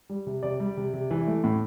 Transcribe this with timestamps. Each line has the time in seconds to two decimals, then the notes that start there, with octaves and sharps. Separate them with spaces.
0.10 G3
0.26 C3
0.43 C3 D5
0.60 G3
0.77 C3
0.94 C3
1.11 E3
1.27 A3
1.44 A2